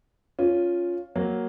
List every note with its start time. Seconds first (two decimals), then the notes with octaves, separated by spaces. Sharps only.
0.39 C#4 F4
1.15 F#3 A#3